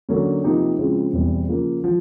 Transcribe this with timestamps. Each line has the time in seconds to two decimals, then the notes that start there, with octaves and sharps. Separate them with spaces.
0.09 D3 F#3 A#3 C#4
0.44 C3 F3 A#3 D#4 G4
0.79 C#3 F3 G#3 C4 E4
1.13 E2 B2 G3 C4 E4
1.48 C#3 F3 A#3
1.84 F3